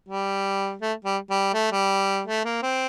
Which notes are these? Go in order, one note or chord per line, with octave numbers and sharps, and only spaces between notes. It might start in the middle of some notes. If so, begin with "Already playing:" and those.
G3
A3
G3
G3
A3
G3
A3
A#3
C4